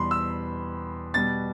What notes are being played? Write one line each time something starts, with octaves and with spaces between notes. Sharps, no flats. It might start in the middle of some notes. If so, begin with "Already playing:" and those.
Already playing: E2 B2 G3 B5 C6
E6
B2 G3 A6